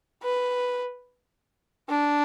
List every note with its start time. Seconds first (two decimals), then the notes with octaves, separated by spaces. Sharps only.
0.23 B4
1.89 D4